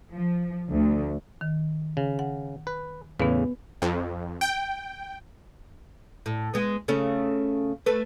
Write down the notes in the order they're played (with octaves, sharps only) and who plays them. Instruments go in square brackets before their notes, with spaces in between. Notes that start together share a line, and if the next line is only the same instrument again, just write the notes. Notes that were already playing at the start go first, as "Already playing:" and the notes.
[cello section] F3
D2
[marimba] D#3
[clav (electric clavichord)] C#3
[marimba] F#5
[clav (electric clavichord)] B4
[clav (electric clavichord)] E2 A2 C#3 [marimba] B3 B4
[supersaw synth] F2
G5
[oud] A2
G#3 B3
C#3 A3 C#4
A3 B4